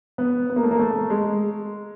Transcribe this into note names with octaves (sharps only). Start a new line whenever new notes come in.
B3
B3
A#3
A3
A#3
A3
G#3